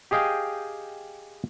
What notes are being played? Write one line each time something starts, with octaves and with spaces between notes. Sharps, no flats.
G4 G#4 D#5 F5 G5